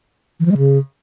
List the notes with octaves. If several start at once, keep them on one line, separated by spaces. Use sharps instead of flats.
E3
F3
G#3
C#3